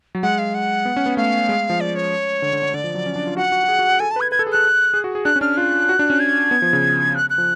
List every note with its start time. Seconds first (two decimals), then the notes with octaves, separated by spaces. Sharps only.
0.15 F#3
0.23 G#3 F#5
0.38 F5
0.54 F#5
0.85 B3
0.96 C#4
1.06 B3
1.17 A3 F5
1.49 G#3
1.70 F3
1.80 D5
1.95 C#5
2.42 D3
2.53 D3
2.63 D3
2.74 D3 D5
2.84 F3
2.95 F#3
3.06 C#4
3.16 D4
3.27 F4
3.37 F#4 F#5
3.52 F#4
3.64 F#4
3.68 G#4
3.79 F#4
3.89 G#4
4.00 A4 G#5
4.11 A5
4.16 B4
4.21 G#6
4.31 B4 G#6
4.39 A4
4.47 G#4
4.52 A4 F#6
4.94 G#4
5.04 F#4
5.15 G#4
5.25 D4 F#6
5.36 C#4
5.41 D4 F6
5.57 F4 F#6
5.89 F#4
5.99 D4
6.10 C#4
6.20 G#6
6.51 B3
6.62 F3
6.73 C#3
7.15 F#6
7.30 F#6
7.38 F3